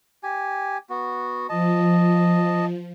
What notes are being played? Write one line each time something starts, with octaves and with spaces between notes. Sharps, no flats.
G4 G#5
B3 F#4
F3 D#5 A5